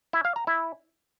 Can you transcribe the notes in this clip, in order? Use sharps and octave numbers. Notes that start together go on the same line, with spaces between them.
E4
F5
A#5
E4